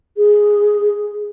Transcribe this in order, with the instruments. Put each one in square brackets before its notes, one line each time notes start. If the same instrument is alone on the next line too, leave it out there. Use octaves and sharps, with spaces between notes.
[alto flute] G#4